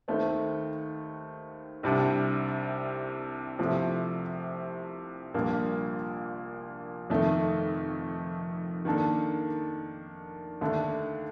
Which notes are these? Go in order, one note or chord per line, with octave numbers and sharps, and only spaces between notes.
D#2 D#3 A3 C4
C2 C3 G3 D4
C2 C3 F3 A3
A#1 A#2 G3 A#3 D4
F1 F2 D#3 A3
D#3 A#3 D4 A4
D#2 D3 A3 D4